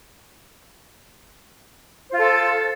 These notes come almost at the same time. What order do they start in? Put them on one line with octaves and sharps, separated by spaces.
C5 F4 A4